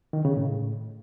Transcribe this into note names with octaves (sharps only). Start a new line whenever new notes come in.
D#3
C#3
A2